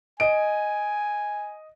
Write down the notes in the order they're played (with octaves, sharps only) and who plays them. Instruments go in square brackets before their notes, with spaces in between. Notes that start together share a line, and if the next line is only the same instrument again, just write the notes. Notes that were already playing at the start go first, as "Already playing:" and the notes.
[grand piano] D#5 D7 [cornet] G#5